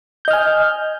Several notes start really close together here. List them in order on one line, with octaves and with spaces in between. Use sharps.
G6 D#5 F6 G#5